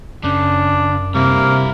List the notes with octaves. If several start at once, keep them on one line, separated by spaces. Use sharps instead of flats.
F#2 C#3 D4
G2 C3 A#3 E4